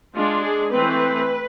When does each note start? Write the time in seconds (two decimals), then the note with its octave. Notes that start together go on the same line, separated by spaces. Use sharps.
0.16 G#3 D4 F4
0.44 G#4
0.72 E3 A3 C4 B4